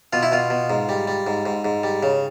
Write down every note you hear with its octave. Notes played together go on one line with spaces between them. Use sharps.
B2 F4
E4
B2 F4
B2
G#2
G3
G3
G#2
G#2
G#2
G3
C#3